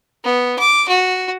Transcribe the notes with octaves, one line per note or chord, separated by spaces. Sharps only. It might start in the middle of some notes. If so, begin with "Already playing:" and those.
B3
D6
F#4